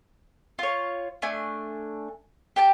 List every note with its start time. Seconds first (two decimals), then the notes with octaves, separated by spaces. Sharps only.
0.59 F4 C#5
1.22 A3 D4 G#5
2.56 G4 G5 A5